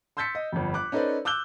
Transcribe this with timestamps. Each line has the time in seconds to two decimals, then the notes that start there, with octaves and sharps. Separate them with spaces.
0.17 C6 E6 G6 A6 B6 C#7
0.35 D#5
0.52 G1 F2
0.74 D6 F#6
0.92 C#4 D#4 A4 B4 C5 D5
1.25 D6 E6 F#6 G6 G7